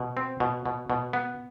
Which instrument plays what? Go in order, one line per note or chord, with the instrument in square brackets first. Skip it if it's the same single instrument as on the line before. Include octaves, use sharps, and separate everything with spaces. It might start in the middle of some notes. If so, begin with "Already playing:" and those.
Already playing: [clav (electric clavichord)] B2
C4
B2
B2
B2
B3